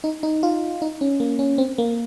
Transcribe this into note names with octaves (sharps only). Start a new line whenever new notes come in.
D#4
D#4
F4
D#4
C#4
A#3
C#4
C4
A#3